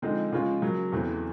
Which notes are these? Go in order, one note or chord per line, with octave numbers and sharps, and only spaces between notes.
D3 F3 G#3 C4 D#4
C#3 F3 G#3 C#4 F4
C#3 F#3 A#3
E2 C#3 E3 A3 C4